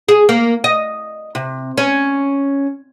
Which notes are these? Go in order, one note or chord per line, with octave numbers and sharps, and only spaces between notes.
G#4
A#3
D#5
C3
C#4